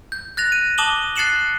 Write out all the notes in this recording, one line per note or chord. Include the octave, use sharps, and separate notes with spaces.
G6
F#6 A6 A#6 F7
D#7
A5 D6 D#6 E7 F#7 G7
F#6 A6 C7 C#7 E7 F#7